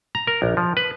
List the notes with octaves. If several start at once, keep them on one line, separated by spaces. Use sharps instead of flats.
A#5
A#4
A#1
F3
B4